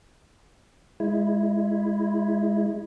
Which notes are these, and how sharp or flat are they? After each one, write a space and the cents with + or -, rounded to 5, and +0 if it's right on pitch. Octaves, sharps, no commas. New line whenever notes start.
G#3 -10 E4 +0